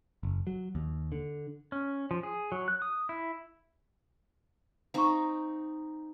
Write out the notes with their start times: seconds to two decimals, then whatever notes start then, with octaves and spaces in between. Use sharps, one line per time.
0.23 F#1
0.47 F#3
0.75 D#2
1.12 D3
1.72 C#4
2.11 F3
2.23 G#4
2.52 F#3
2.68 F#6
2.82 D#6
3.09 E4
4.94 C4 D#4 F5 A#5 C#6